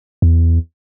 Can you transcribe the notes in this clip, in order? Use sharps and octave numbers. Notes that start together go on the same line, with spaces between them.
E2